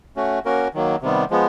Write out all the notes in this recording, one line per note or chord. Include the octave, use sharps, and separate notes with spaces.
A3 C#4 F#4
A#3 C#4 F#4 A#4
D#3 F#3 A#3
C3 D#3 G3 B3
F3 G#3 B3